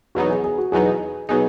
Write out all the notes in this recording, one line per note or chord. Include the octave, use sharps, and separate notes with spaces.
E2 B2 F#3 B3 D#4 F#4
G#4
G#4
F#4
E2 B2 F#3 B3 D#4 G#4
B2 F#3 B3 D#4 G#4